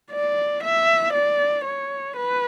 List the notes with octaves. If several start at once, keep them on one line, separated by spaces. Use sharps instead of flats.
D5
E5
D5
C#5
B4